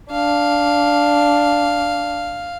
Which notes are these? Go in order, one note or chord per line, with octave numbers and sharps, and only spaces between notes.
D4 F5